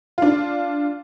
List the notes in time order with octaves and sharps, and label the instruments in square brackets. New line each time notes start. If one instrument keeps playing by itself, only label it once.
[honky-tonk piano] D4 F4